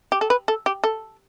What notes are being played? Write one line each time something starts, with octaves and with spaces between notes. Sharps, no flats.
G4
A4
B4
A4
G4
A4